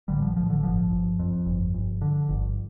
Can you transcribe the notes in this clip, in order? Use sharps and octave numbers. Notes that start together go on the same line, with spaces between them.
A1 D3 G3
F3
A1 F3
D3
G1 F3
G1
F2
G1
G1
D3
G1